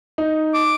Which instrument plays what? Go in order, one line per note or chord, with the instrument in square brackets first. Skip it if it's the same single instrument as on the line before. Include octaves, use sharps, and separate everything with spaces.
[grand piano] D#4
[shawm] D6